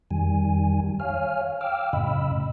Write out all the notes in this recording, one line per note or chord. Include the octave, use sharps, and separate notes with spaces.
F2 D#3 G3 G#5
C#5 F5 G#5 F6
F5 G5 D6 E6 F6
F#2 A2 C#3 D#5 B5 E6